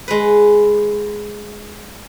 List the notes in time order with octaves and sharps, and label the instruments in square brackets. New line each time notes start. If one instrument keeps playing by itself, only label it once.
[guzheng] G#3 B4